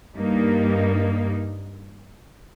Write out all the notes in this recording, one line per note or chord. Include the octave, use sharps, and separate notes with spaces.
G2 G3 A#3 D#4